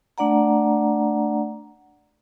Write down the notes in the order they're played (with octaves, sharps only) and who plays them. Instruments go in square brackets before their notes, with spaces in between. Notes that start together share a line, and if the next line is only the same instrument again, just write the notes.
[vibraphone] A3 D4 D5 F#5 A#5